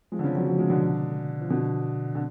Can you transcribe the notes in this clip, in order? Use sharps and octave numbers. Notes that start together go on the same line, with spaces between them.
F3 G#3
D3
C#3 F3
D3 F#3
D3 F#3
F3 G#3
B2 D3
F3
B2 D3
D3